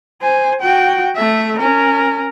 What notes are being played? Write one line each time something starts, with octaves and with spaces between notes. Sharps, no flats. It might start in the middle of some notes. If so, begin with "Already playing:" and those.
C5 G#5
F#4 G5
A3 E5
C#4 A#4